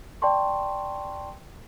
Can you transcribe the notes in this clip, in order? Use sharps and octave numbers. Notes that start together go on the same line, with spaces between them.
D5 G5 A5 C6 C#6